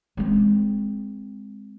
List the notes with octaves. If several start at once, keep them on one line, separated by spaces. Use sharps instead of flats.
G#3 C4